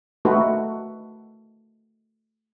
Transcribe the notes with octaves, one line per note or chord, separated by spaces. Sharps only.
A3 D#4 F#4 B4